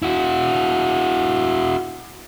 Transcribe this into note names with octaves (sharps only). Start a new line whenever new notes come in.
E4 F#4